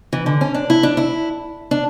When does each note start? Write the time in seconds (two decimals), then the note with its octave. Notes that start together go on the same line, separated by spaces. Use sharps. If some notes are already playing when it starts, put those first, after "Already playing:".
0.13 E3
0.26 D3
0.41 C#4
0.55 D4
0.70 E4
0.83 D4
0.97 E4
1.71 D4